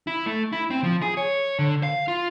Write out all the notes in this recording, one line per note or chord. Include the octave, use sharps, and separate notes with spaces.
E4
A3
E4
C4
F3
G#4
C#5
D3
F5
F4